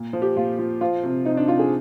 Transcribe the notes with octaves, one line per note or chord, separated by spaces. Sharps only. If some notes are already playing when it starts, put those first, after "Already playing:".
Already playing: A#2
F3
G4
A#2 F4
F3
F3 F4
C3
C3 D#4
D4
C3 F4
G#4